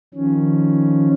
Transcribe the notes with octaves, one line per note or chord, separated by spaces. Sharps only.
D#3 F3 C#4